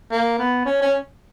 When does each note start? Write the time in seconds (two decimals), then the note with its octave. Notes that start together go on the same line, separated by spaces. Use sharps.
0.12 A#3
0.39 B3
0.66 C#4
0.82 C#4